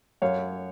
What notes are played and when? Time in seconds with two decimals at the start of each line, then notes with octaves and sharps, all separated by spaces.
0.22 F#2 C#5 F5